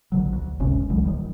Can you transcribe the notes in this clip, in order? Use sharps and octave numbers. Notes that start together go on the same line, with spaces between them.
A#1 D3 F#3
D2
G1 C#2 C3 C#4
C#2 E3 F#3 G#3
D#1 D#3 G3